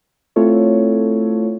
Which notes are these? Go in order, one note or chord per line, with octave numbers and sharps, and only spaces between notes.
A3 C4 E4 F4 A4 C#5